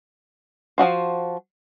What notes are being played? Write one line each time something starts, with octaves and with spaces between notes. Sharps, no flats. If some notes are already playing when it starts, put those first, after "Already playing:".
F3 A3 F#4 C5